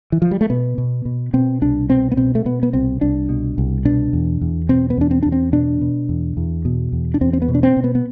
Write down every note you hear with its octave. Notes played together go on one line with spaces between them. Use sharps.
E3
F3
G3
A3
B2 B3
B2
B2
B2 C4
C2 D4
B2 C4
B3
B2 C4
A3
B2 B3
B3
C2 C4
C2 D4
B2
C2
B2 D4
E2
E2
B2 C4
B3
E2 D4
C4
E2 D4
C4
B2 D4
B2
E2
E2
B2
E2
D4
E2 C4
C4
B3
B2
D4
C4
B2
B3
B3